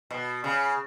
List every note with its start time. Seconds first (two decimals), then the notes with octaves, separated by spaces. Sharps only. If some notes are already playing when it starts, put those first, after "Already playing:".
0.11 B2
0.44 C#3